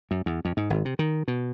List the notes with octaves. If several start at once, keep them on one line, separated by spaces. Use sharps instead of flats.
F#2
E2
F2
G#2
G#1
C3
D#3
B2